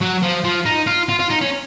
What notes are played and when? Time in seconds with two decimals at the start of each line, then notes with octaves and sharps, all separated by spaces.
0.01 F#3
0.22 F3
0.44 F3
0.66 D#4
0.87 F4
1.09 F4
1.19 F4
1.30 D#4
1.41 C#4